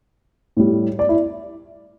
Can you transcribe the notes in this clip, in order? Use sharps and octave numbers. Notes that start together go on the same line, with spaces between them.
A2 G3
D5
E4